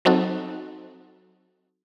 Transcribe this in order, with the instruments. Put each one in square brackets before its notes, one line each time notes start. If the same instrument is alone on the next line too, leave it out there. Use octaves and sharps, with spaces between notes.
[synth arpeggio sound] F#3 C4 D#4 F#4 A4